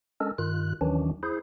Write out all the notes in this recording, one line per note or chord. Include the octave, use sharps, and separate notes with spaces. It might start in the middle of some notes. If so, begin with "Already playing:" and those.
G#3 C#4 D4 A4 A#4
G2 D#3 F4 F#6
D#2 D#3 E3 F#3 C#4 D4
E4 G#4 C5